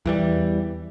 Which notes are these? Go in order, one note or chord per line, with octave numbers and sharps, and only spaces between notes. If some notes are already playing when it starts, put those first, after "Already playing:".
E2 E3 G3